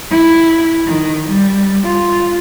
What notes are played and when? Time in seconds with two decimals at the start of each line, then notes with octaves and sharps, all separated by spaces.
0.10 E4
0.86 D#3
1.29 G3
1.84 F4